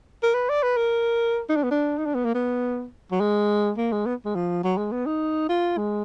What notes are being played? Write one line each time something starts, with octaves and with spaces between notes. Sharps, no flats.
A#4
B4
D5
B4
A#4
D#4
D4
B3
D4
D#4
D4
B3
A#3
B3
F#3
G#3
A#3
G#3
B3
G#3
F3
F#3
G#3
B3
D#4
F4
G#3